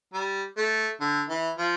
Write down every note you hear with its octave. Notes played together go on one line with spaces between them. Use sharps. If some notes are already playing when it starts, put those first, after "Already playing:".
G3
A3
D3
E3
F3